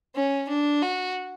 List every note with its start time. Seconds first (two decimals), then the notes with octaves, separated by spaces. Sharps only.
0.16 C#4
0.49 D4
0.83 F#4